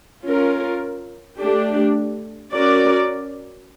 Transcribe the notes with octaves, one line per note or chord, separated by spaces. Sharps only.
C#4 F4 A#4
A3 D4 G4
C#4 F#4 A#4 D5